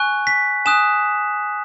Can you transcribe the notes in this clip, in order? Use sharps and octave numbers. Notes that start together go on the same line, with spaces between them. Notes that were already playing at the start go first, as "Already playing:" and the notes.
Already playing: G#5 C#6 F#6
B6
G#5 D#6 F#6 E7